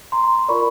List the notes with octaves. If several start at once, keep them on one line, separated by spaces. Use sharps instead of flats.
A#5 C6
F4 A#4 D5 B5 C#6